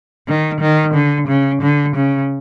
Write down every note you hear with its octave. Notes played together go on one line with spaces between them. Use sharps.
D#3
D#3
D3
C#3
D3
C#3